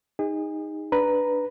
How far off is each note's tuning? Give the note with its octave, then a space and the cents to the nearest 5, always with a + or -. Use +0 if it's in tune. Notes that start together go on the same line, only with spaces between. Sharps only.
D#4 +0 G#4 -35
D4 +0 B4 +0 A#5 +0